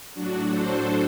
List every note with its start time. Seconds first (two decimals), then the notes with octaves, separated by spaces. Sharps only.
0.15 A2 F#3 D4 F#4
0.50 A4 C5